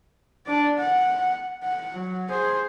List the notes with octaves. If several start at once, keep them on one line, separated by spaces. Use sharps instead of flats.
D4 D5
F#5
F#5
F#3
G#4 C5